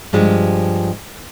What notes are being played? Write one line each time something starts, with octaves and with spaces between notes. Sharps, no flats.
G2 F3 G#3 G4